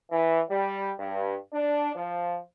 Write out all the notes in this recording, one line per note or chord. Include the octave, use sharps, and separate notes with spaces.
E3
G3
G2
D4
F3